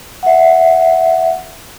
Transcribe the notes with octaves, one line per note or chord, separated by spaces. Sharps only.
E5 F#5